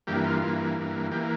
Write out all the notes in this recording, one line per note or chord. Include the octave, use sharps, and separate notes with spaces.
G2 E3 A#3 G4
F4
G2 E3 A#3
G2 E3 A#3
E3 A#3 G4